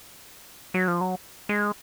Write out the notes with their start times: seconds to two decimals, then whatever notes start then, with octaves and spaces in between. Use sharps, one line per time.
0.74 F#3
0.88 F3
1.01 F#3
1.49 G#3